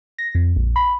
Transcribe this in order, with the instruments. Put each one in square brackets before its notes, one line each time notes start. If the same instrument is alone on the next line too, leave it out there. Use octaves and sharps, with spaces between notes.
[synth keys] A#6
F2
A#1
B5